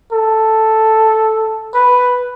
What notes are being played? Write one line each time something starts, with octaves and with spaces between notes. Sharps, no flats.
A4
B4